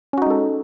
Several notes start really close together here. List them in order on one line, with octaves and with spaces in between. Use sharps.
C#4 F#4 D#4 G#3 A4